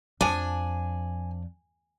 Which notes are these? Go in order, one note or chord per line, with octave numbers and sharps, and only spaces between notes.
F2 F3 D4 G#5